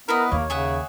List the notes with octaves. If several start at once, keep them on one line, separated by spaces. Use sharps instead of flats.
B3 E4 A#4 B4 D#5
D#2 A#3 C#5
C#3 G#4 E5 F#5